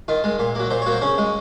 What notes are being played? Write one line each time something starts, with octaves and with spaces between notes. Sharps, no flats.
D#3 F4
G#3
A#2
F#3 A#3
A#2 C5
C#5
F#3 A#3
C5
C#3 C#4
G#3